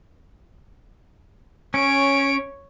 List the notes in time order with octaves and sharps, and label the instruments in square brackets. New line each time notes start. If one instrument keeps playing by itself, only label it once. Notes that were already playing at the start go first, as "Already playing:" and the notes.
[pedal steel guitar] C#4 [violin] C#5 D7